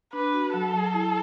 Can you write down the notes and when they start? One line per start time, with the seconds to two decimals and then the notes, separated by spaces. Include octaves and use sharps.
0.13 D4 B4
0.34 F#4
0.53 F#3 A4
0.74 F#3
0.94 E4